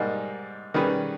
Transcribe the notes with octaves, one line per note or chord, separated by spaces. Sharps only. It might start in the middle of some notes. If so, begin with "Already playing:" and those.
Already playing: G#2 G3 A#3 D#4
D#3 G3 C#4 G#4 B4